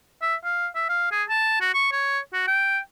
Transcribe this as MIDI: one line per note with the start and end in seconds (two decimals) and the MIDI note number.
0.22 0.35 76
0.44 0.67 77
0.75 0.88 76
0.89 1.11 77
1.12 1.23 68
1.29 1.57 81
1.61 1.71 66
1.74 1.90 85
1.92 2.19 73
2.33 2.44 66
2.48 2.79 79